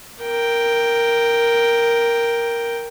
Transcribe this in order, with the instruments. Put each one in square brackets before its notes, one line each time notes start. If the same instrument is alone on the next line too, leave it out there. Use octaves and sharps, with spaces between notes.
[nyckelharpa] A#4 G5